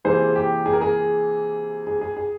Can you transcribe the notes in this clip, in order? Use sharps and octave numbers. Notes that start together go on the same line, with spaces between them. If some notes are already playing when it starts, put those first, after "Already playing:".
C3 E3 A#3 G#4 C5
G4
G#4
A#4
G#4
G#4
G#4
G#4